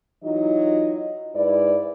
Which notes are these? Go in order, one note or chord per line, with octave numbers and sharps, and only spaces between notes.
E3 F#3 D#4 F4 D#5
G#2 E4 B4 D5